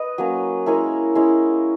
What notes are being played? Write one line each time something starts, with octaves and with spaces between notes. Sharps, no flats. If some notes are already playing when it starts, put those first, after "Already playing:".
Already playing: B4 D#5
F#3 A#3 C#4
G#3 C#4 E4 A#4 C#5
G#3 C#4 E4